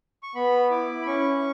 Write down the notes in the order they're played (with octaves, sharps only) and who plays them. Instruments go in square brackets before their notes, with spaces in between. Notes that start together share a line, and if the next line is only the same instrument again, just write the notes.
[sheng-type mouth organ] C#6
B3 B5
E4 D6
B5
C#4 C#6